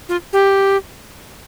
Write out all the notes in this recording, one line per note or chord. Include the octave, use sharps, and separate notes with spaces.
F4
G4